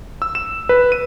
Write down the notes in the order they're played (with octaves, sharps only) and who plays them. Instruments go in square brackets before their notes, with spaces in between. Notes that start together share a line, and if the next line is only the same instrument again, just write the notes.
[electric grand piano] E6
E7
B4
D#7